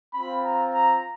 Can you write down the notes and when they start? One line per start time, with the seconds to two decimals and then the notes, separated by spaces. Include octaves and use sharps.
0.14 C4 F4 B5
0.44 A#5
0.74 A#5